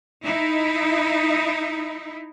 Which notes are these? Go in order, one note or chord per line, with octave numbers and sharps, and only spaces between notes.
D#4 E4